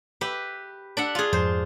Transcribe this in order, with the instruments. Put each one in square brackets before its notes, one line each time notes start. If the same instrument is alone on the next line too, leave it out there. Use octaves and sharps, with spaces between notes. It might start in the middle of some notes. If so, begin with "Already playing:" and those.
[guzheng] G4 B4 E5
D4 E5 F#5
F4 G#4
[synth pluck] F2 G#2 F3 [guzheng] C5